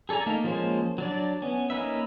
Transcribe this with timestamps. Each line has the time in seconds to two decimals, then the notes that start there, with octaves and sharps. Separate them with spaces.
0.09 G#4 A4 D5 G#5 A#5
0.26 A3 A#3 D#4 F5
0.44 F3 G#3 A#3 C#4 C5
0.98 F#3 D4 D5
1.42 B3 C#4
1.70 A#3 C#4 D#4 B4 E5